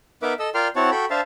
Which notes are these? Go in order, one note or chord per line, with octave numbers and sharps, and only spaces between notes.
B3 D#4 A#4 B4 E5 D6
A4 D#5 E6
F4 A#4 D5 G5 C6 F6
C4 E4 F#4 C#5 F#5 A5
F#4 A4 G5 B5
D4 C5 E5 F5 A5